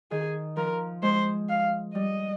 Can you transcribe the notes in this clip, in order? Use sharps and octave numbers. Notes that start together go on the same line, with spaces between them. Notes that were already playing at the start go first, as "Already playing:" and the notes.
D#3 G#4
F3 A#4
G#3 C5
F5
G3 D#5